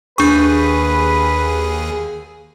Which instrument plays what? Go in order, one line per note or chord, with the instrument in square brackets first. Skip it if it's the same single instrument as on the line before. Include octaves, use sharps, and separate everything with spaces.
[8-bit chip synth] D#2 G#4 [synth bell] D4 C#6 [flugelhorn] B4